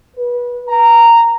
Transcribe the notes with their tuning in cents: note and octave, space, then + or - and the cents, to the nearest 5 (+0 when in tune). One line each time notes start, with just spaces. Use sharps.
B4 -25
A#5 -10